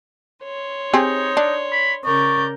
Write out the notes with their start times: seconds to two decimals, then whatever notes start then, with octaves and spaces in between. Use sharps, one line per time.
0.44 C#5 C6
0.94 C4 D#4 G4 G#4
1.37 D4
1.72 B5
2.05 C#3 A#4 D5 C#6 G6